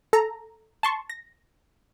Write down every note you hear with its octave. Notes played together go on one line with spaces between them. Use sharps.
A4 A#5
A5 C6 C#6
A#6